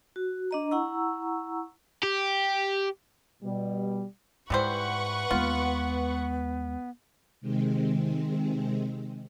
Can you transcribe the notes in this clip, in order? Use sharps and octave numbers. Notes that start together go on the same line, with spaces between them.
F#4
D4 D#5 A#5
E4 F#5 A#5 C#6 E6
G4
B2 G3
G#2 E3 G3 B4 C5 F#5 C#6
D#2 G#3 B3 F4
C3 D#3 G#3 C4